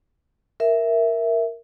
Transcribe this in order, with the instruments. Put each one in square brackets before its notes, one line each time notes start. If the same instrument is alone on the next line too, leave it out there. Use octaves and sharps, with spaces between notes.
[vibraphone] A#4 E5